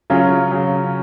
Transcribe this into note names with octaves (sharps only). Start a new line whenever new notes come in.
C#3 F#3 C#4 F4
C#3 F#3